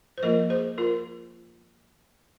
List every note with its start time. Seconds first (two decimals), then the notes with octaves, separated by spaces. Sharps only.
0.18 C5
0.23 F3 A#3 F4 A#4 D#5
0.50 G#4 C5
0.78 F4 A#4